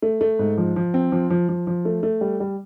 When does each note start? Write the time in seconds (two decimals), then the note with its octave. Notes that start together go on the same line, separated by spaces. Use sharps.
0.02 A3
0.21 A3
0.39 G#2
0.57 F3
0.76 F3
0.94 C4
1.12 F3
1.30 F3
1.49 F3
1.67 F3
1.85 A3
2.03 A3
2.21 G3
2.40 G3